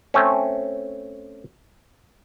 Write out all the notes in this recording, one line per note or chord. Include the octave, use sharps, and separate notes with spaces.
A3 C4 C#4